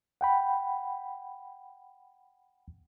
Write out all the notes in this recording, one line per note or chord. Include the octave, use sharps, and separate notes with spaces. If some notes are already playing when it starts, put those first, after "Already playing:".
F#5 G5 B5